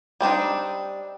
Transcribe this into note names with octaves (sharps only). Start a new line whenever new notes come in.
G3 C4 D4 D#4